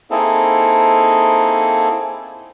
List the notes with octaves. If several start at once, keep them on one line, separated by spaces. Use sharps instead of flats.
A#3 C4 D#4 E4 G#4 A4